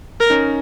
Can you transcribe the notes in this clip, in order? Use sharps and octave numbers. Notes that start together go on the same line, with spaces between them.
A#4
C#4 D#4